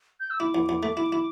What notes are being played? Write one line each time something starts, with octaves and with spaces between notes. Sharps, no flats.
G6
E6
E4 D6
E2
E2
A3
E4
E4